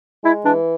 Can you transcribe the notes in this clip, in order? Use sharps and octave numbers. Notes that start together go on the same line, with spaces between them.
G#3 E4
E3 D4